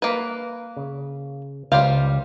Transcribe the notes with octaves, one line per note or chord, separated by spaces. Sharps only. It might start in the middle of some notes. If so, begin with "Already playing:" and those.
A#3 B4
C#3
C#2 G3 C5 F5